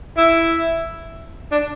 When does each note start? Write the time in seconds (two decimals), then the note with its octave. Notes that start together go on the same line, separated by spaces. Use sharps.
0.17 E4
1.52 D4